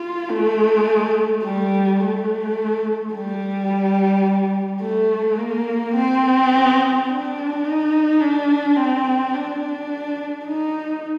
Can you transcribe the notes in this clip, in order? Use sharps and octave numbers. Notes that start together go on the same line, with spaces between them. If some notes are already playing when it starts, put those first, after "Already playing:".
Already playing: F4
A3
G3
A3
G3
A3
A#3
C4
D4
D#4
D4
C4
D4
D#4